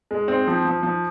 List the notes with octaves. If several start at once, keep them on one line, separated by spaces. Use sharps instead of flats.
G#3
C4
F3
F3
F3